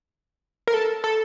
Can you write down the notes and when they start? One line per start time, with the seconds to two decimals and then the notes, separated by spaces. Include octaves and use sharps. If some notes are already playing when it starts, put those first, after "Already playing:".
0.67 A#4
0.74 A4
1.04 A4